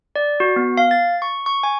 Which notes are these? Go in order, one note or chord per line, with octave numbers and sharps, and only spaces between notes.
D5
F#4
B3
F5
A6
C#6
C#6
G#5